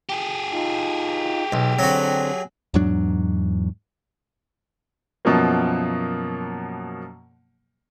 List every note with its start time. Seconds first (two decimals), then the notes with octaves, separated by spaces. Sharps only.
0.09 G4 G#4
0.52 D#4 F4
1.52 B1
1.79 D3 F#3 C4 F#4
2.74 E2 G#2 F#3 D4
5.25 F#2 B2 F3 F#3 A#3